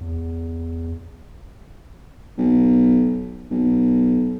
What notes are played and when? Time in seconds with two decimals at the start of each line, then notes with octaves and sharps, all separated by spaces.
0.01 E2
2.38 B1
3.51 B1